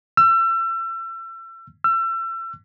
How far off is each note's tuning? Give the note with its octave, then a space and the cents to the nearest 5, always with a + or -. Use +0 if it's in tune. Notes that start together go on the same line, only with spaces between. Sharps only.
E6 +35
E6 +35